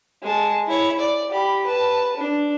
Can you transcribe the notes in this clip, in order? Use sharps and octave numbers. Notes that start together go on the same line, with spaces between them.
G#3 A5
E4 C#5
D5
G4 B5
B4 A5
D4